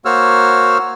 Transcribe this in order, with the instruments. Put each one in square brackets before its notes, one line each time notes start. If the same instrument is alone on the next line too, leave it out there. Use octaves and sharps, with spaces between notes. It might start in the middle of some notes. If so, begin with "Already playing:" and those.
[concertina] A#3 F#4 C5 C#5 E6 F6